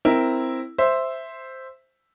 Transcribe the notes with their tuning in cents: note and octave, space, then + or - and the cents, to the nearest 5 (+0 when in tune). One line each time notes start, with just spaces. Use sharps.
C4 +0 E4 +0 A#4 +0
C5 +0 E5 +0